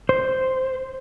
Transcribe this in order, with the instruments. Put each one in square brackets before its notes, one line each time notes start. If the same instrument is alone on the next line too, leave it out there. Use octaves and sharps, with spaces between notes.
[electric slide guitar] C5